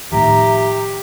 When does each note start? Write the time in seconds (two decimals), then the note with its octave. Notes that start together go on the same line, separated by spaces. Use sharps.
0.12 A2 D#3 F3 G4 E5 A#5